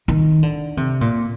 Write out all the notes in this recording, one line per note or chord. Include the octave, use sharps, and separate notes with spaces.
D#3
D3
C3
A#2